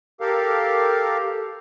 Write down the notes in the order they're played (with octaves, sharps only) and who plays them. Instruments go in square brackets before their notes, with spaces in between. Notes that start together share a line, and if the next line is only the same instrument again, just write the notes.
[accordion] G4 A4 A#4 F5